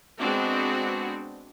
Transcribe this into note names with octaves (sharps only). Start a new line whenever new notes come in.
G#3 B3 C4 D4 F#4